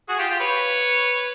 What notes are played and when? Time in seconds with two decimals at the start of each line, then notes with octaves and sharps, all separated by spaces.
0.09 F#4 G#4
0.19 F4 G4
0.30 F4 G4
0.40 B4 C#5